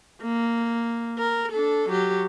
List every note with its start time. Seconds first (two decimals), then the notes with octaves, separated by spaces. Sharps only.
0.22 A#3
1.19 A#4
1.52 D4 A4
1.89 F#3 G4